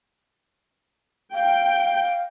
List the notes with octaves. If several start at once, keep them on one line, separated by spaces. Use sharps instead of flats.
F5 G5